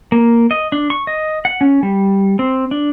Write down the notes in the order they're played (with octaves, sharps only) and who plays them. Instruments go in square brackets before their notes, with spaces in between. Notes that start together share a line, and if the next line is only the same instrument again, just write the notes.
[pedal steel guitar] A#3
D#5
D4
C#6
D#5
F#5
C#4
G3
C4
D4